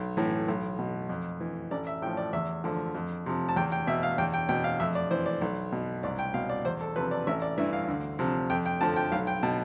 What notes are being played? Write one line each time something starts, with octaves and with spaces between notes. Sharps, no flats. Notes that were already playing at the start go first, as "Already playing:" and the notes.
Already playing: B1
A2 E3
B1
B2
F2
E3
A1 D5
E5
A2 F3 G5
D5
E2 E5
D3 F3
F2
C3 F3
A5
E2 G5
G5
B2 E5
F5
E2 G5
G5
B2 G5
F5
F2 E5
D5
E3 C5
D5
B1
B2
C2 D5
G5
B2 F5
D5
E2 C5
A4
C3 F3 B4
D5
A1 E5
D5
G2 E3 E5
F5
D2
C3 F3
F2 G5
G5
D3 F3 A5
G5
B1 F5
G5
B2 A5